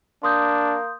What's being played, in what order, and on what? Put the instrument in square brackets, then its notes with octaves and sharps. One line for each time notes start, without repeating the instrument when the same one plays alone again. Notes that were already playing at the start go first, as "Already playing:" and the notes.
[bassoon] A#3 [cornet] D4 [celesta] C6 D#6 G6